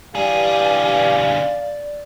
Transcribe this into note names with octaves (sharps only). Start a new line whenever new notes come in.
G2 D3 E3 G4 G#4 D5 F5